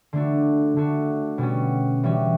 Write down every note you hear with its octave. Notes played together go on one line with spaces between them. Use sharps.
D3 A3 D4 F#4
D3 A3 D4 F#4
B2 G3 C#4 F#4
E3 G3 C#4 F#4